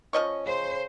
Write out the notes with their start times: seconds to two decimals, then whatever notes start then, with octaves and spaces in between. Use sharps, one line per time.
0.13 F3 C#4 D#5 C#6
0.46 C#3 C5